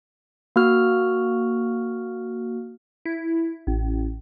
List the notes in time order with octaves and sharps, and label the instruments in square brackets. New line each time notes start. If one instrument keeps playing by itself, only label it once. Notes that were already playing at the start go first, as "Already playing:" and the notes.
[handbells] A#3 F#4 F6
[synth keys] E4
A1